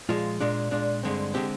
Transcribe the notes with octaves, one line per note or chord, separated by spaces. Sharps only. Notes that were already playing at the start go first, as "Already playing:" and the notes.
A#2 F3 G#3 F4
A#2 G#3 D4
A#2 G#3 D4
G2 D3 G#3 C4
D3 G#3 C4 G4